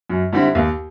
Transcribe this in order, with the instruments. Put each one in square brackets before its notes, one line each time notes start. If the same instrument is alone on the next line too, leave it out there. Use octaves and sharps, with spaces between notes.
[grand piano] F#2
D3 G3 C4 E4
D#2